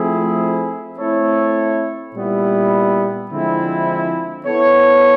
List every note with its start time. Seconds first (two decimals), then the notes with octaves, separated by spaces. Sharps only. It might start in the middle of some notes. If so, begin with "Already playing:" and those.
Already playing: F3 A3 C4 E4 G#4
0.97 A3 C4 E4 A4 C#5
2.14 A#2 G3 B3 E4
3.30 D3 F3 G#3 C4 E4
4.46 B3 E4 A4 C#5